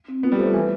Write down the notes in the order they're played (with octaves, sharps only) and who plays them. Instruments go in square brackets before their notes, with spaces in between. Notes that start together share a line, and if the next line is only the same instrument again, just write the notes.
[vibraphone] C4
[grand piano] B3 [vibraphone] F4
[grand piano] G3
[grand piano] A3 [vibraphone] C5
[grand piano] E3 [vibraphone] B4